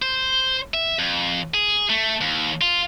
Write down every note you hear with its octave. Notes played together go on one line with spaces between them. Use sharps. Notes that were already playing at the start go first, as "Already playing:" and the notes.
C5
E5
F2
G#4
A3
D#2
F4